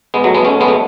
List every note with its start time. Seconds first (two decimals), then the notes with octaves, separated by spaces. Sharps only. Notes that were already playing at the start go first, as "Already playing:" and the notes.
0.14 G#3 B3
0.24 F#3 A3
0.35 G#3 B3
0.45 A3 C#4
0.60 G#3 B3
0.68 A3